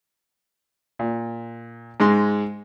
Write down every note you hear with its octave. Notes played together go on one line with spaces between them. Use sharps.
A#2
G#2 G#3 C6